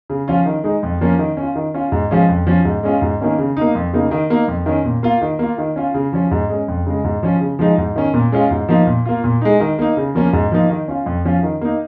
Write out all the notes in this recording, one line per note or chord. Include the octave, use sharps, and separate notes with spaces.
C#3
F3 C#4 F4
D#3
G#3 D#4
F2
F3 A#3 C#4
D#3
C#4 F4
D#3
C#4 F4
G#2
F3 G#3 C#4 F4
F2
F3 C#4
G#2
G#3 C#4 F4
G#2
D#3 A#3 C#4
C#3
A#3 D#4
F2
C#3 A#3 D#4
D#3
A#3 D#4
F2
D#3 C#4
A#2
A#3 F4
D#3
A#3 F4
D#3
C#4 F4
C#3
F3 C#4
G#2
G#3 C#4
F2
C#3 G#3
G#2
F3 C#4
C#3
F3 G#3 D#4
G#2
D#3 C#4
A#2
G#3 C#4 F4
G#2
F3 A#3 D#4
A#2
A#3 F4
A#2
G#3 D#4
D#3
A#3 D#4
C#3
F3 A#3 C#4
G#2
F3 A#3 D#4
D#3
C#4 F4
F2
F3 C#4 F4
D#3
A#3 D#4